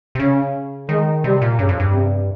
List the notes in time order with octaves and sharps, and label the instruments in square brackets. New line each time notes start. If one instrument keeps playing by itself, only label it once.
[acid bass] C3
[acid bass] C#3 [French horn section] C#4
[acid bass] D#3 [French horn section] G#3
[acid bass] C3 [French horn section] G3
[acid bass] A#2
[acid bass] G2 [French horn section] C#3
[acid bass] F2
G2
[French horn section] C3